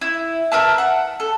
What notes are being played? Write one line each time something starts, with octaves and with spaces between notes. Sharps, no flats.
E4
A#4 B4 E5 A5
F#5
A4